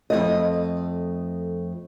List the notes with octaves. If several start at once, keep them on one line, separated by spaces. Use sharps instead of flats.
F2 A3 D#5